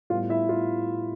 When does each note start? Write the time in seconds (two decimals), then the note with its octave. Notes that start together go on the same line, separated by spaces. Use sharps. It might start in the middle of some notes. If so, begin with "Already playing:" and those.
0.10 A2 G3 B3 F4 F5
0.29 E4 E5
0.49 F4 F5